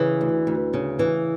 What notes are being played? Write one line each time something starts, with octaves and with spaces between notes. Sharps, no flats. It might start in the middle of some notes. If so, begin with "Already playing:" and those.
Already playing: C#3 E3
D2
D2
C#3
E3